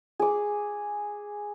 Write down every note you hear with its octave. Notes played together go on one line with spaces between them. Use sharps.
G#4 D6